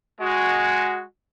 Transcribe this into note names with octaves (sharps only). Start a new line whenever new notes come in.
G#3 F#4